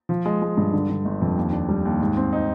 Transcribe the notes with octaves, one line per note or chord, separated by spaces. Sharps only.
F3
G#3
G#3
G2
D3
D3
G1
F2
D#2
D4
G3
D#2
G#2
C4
D#4